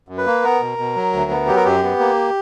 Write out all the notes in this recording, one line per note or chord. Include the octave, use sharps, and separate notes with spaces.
F#2
B4
A#3
B3 A#4
B2
B2
F#3
D2
B3
F#3 G4
A#4
F#2 G4
B3
A#3